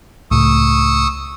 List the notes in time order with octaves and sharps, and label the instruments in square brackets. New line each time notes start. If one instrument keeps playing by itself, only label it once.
[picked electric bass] C#2 A2 [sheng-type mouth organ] C#6 D#6 E6